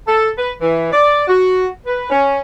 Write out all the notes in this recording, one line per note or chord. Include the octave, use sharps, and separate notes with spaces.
A4
B4
E3
D5
F#4
B4
C#4